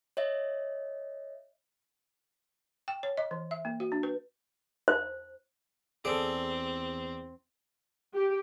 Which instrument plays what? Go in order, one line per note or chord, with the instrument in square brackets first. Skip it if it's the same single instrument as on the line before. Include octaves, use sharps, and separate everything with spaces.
[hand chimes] C#5 D#5 E5
[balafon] G5
C#5
D#5
E3
E5
A#3
F#4
D4
B4
[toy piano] C5
[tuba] E2 [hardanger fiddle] C4 [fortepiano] G#4 A4 [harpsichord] D5
[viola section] G4